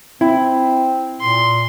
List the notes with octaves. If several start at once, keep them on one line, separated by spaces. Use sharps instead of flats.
C4 E4
A#2 C6